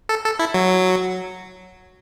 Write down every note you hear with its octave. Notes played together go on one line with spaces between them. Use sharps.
A4
A4
E4
F#3